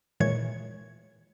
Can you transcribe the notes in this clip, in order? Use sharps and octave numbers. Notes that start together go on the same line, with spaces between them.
A#2 D#3 E3 G#3 C#5 G#6